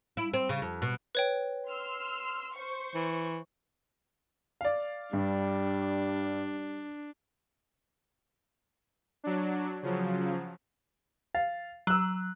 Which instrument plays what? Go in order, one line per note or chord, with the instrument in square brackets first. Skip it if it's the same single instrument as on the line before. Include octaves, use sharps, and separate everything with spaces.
[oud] E4
C4
C#3
F2
B2
[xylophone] B4 C#5 G5
[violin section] C6 E6 F6
C5 C#6
[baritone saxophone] E3
[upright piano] D5 F5
[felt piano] G2 [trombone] G3 [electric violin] D4
[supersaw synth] F#3 D4
C#3 F3 F#3
[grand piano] F5 [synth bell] A6
[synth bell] F#3 [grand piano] E6 F#6